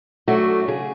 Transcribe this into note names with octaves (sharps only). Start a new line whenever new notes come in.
F#3 A3 D4 F#4
C#3 G#4